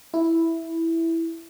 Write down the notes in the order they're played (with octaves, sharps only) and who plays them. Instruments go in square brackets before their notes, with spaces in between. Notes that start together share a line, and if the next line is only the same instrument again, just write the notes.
[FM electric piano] E4